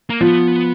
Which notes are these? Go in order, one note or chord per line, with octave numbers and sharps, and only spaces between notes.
A#3
F3 B3